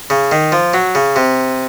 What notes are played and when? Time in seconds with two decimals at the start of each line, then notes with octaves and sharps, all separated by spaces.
0.10 C#3
0.31 D#3
0.52 F3
0.74 F#3
0.95 C#3
1.16 C3